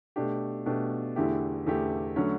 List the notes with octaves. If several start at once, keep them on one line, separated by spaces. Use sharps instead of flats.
B2 A3 D4 G4
B2 A3 D4 G4
E2 D3 A3 E4 G4
E2 D3 A3 E4 G4
D3 F#3 A3 C#4